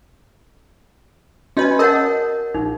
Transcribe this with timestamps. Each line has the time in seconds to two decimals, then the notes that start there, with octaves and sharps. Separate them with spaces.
1.57 C#4 F#4 B4 C#5 D#5 G#5
1.79 A#4 C#5 D#5 F#5 A5
2.54 A#1 D#4